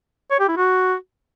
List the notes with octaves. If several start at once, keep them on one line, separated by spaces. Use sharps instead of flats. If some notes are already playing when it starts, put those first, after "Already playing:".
C#5
G4
E4
F#4